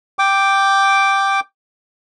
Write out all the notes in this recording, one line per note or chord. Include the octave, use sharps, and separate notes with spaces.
G5 D6